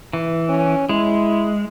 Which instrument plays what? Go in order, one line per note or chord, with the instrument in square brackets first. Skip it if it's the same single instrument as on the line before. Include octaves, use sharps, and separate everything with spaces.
[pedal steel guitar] E3
[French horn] C#4
[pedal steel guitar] G#3 [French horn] E4